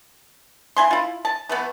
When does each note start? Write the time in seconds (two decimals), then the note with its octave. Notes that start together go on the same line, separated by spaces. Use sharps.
0.77 E4 G#5 C6
0.91 E4 F4
1.25 A5
1.49 E3 A3 B3